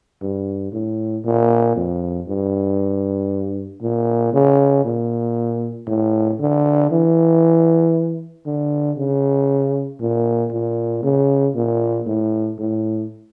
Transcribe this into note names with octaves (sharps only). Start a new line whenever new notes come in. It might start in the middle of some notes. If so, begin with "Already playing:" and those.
G2
A2
A#2
F2
G2
A#2
C#3
A#2
A2
D3
E3
D3
C#3
A#2
A#2
C#3
A#2
A2
A2